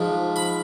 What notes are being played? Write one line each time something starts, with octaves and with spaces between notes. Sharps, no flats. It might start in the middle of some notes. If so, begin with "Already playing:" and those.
Already playing: G#2 F3
B5